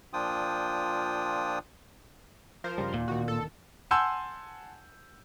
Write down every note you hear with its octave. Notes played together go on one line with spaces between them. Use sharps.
A#2 F3 D4 F4 G5 D#6
F3 A#4 C5
G2 C#3 G3
D#2 A#2
D1 D#3 F#4
A4
F#5 G#5 A5 C6 E6 G6